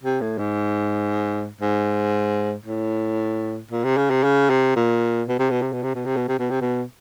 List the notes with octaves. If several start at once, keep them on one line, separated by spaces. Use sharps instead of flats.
C3
A2
G#2
G#2
A2
A#2
C3
C#3
C3
C#3
C3
A#2
B2
C3
B2
C3
B2
C3
B2
C3
B2
C3
B2
C3
B2